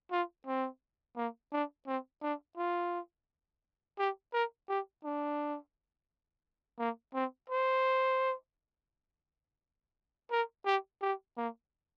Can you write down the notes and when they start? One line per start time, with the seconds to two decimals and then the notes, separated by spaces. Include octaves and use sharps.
0.12 F4
0.47 C4
1.17 A#3
1.53 D4
1.87 C4
2.22 D4
2.57 F4
3.99 G4
4.33 A#4
4.69 G4
5.04 D4
6.79 A#3
7.14 C4
7.50 C5
10.31 A#4
10.66 G4
11.02 G4
11.37 A#3